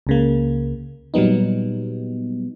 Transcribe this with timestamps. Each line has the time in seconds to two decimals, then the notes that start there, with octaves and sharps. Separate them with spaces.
0.07 C#2 C#3 A#3
1.14 A#2 F#3 G3 B3 D#4